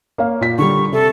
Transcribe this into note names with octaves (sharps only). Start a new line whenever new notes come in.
A#3 C#5 F5
A#2 B6
D3 G3 C#6
C3 A4